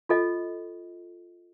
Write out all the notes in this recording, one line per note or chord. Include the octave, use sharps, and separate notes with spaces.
F4 A4 D#5